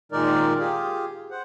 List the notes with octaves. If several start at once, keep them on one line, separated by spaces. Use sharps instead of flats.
A#2 D#3 G#3 D#4 A#4 D5
F4 G4 G#4
C5 F#5